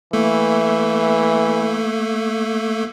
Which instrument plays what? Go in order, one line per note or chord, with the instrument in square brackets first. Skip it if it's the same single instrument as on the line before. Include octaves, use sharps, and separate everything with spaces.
[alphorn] E3 [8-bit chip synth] A3 A#3 A4